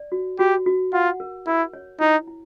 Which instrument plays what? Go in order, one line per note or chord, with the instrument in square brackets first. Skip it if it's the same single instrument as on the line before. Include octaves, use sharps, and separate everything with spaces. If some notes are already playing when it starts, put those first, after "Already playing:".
Already playing: [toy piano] D5
F#4
[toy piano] F#4 [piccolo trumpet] G4
[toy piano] F#4
[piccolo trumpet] F4 [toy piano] F#5
[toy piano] A#4
[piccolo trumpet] E4 [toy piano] A#4
[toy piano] C#5
[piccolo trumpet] D#4 [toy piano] E4
[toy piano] E4